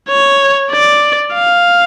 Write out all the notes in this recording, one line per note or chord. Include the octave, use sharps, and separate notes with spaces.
C#5
D5
F5